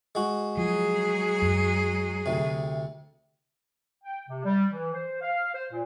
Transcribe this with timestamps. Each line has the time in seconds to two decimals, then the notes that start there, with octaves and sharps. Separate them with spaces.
0.15 G#3 F#4
0.57 F3 F#3 G#4
1.42 F#2
2.26 D2 C3
4.04 G5
4.29 C3
4.45 G3
4.72 E3
4.94 C5
5.22 F5
5.54 C5
5.71 A#2